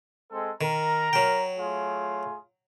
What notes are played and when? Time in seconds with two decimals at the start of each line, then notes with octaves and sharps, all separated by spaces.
0.31 G#3 C4 A4
0.61 D#3 A#4 A#5
1.13 F#3 G5
1.56 A3 F4 G#4